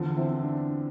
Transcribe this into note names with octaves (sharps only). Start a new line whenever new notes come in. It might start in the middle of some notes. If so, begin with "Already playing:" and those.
Already playing: E2 D3 F3
C4 E4
D4